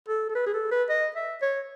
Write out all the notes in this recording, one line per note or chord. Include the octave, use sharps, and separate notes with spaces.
A4
A4
B4
G#4
A4
B4
D#5
E5
C#5